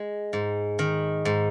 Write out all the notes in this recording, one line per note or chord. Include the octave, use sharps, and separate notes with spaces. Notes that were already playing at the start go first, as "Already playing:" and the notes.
Already playing: G#3
G#2
D#3
G#2